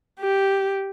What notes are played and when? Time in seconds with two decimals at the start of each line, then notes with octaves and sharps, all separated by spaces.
0.20 G4